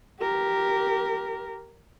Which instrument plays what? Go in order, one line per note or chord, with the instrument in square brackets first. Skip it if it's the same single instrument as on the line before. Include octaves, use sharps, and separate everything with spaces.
[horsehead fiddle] G4 A#4